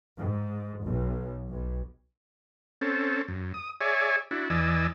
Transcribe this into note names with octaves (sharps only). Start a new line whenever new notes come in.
G#2
B1
B1
C4 C#4 A4
F#2
D#6
G#4 C#5 D5 E5 G#5
D4 E4 F#4
E2 E3 D5 D#5 G#5 E6